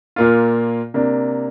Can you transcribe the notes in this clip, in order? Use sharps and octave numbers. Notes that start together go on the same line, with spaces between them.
A#2 A#3 F4
C3 A#3 D4